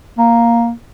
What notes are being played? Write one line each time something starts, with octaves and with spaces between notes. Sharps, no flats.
A#3